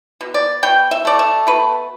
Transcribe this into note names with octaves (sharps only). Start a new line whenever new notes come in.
B2
D5
B2 G5
E5
A3 D5
E5
B2 B4